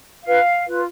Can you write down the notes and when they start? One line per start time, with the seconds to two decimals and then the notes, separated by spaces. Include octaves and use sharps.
0.24 F4 B4 F5
0.67 F4 B4